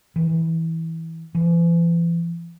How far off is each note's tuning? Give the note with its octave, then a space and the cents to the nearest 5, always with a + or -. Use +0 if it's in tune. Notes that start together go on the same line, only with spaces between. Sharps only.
E3 -15
E3 +40